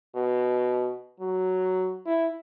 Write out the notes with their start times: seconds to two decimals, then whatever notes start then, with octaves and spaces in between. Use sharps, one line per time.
0.15 B2
1.20 F#3
2.06 E4